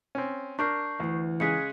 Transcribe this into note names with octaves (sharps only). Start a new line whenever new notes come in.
C4 C#4
D4 A#4 C#6 G6 C7
D2 E3
C#3 G#3 G#4 F#6 B6 C#7